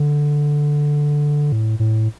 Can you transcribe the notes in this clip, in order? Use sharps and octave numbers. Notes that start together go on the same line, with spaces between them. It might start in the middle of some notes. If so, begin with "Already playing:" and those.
Already playing: D3
A2
A2